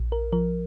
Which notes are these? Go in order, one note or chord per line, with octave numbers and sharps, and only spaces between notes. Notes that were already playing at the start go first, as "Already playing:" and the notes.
Already playing: A#1
A#4
F3 A#4